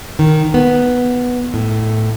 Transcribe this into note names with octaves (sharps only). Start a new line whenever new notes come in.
D#3
B3
A2